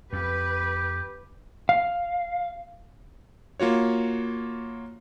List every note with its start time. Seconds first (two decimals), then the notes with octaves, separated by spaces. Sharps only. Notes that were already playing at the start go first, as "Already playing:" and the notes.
0.13 F2 G4 B4
1.69 F5
3.60 A#3 F4 F#4 C#5